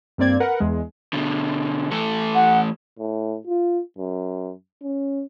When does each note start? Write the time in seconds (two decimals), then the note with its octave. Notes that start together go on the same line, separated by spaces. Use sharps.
0.18 G2 A#3 C4 D5 G#6
0.40 A#4 B4 F#5
0.60 E2 G#3
1.13 B2 D3
1.91 E3 A3 A4
2.35 F#5
2.99 A2
3.47 F4
3.98 F#2
4.83 C#4